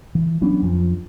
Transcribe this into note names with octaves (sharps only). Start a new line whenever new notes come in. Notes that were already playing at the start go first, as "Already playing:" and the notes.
E3
F#3 B3 C#4 D4
F2 F3